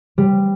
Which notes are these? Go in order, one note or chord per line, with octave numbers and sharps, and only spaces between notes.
G3